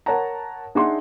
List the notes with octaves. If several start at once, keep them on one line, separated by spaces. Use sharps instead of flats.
A#4 C#5 F#5 A5 A#5
D4 D#4 G#4 E5 F#5 C6